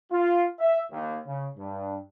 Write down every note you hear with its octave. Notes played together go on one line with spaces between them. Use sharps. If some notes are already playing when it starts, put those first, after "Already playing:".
F4
E5
D#2
C#3
G2